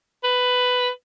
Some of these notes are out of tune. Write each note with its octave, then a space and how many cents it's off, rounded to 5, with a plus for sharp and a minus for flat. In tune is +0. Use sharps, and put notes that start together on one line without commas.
B4 +10